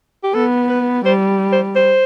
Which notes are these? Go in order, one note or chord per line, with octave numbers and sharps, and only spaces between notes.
G4
B3 A4
B4
G3 C5
C5
C5